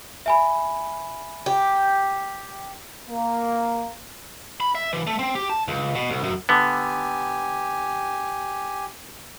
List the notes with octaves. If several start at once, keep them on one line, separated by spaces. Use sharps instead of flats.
E5 G#5 B5
G4
A#3
B5
E5
E3
A3
C4
G4
A5
C#2
B2
C2
F#2
D3 B3 G4 G#5